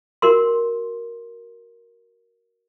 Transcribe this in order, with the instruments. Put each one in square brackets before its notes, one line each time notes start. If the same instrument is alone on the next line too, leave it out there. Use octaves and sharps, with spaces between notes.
[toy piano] F#4 A#4 C6